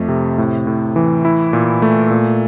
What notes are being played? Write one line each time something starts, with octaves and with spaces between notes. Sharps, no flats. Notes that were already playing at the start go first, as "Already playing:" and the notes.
Already playing: F2 A3
C3
A2
A2
E3
E4
A#2
A3
A#2